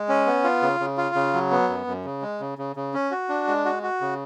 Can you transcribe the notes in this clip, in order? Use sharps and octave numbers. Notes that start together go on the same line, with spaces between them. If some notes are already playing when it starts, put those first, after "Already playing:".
Already playing: G#3
C#4
B3
F4
C#3
C#3
F4
C#3
F#3
B3
F#2
F#2
C#3
G#3
C#3
C#3
C#3
C#4
F#4
D4
G#3
F#4
F#4
C#3